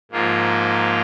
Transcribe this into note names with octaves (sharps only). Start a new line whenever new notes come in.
G#2 F3 A#3 F4